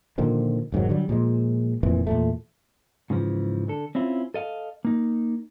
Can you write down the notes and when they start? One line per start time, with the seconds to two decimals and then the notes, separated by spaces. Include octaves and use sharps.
0.18 A#2 D3 D#3 F3
0.72 F1 G#2 D#3 F#3
0.89 D3 F#3 G3
1.09 A#2 F3 G#3
1.83 F1 F2 A#2 E3
2.07 E2 A#2 A3
3.10 G#2 C#3 E3 F3
3.68 D3 A4
3.95 C4 C#4 E4 F4
4.34 A4 D#5 F5
4.85 A#3 D#4